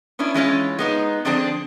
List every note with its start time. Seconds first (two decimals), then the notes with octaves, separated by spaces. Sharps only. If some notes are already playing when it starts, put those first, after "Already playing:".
0.19 B3 C#4 D4 E4
0.34 E3 G#3 C#4 F4
0.79 G#3 B3 D#4
1.25 D3 F3 C4 D4 G#4 C5